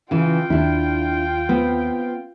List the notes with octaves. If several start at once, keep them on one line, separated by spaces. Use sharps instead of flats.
C#3 E3 F4 G5
D#2 D4 E4
B3 C4